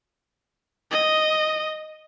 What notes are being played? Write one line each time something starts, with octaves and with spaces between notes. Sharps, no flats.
D#5